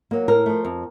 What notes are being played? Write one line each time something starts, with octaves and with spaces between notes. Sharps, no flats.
F#3 A#3
A2 A#4
F3 A3
F2